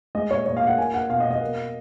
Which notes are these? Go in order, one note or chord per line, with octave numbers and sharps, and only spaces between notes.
G#3 D#5
A#2 C#5
A#2 C#5
F5
A#2
F#5
A#3 G#5
A#3 F#5
B2 F5
D#5
B2
D#5
A#3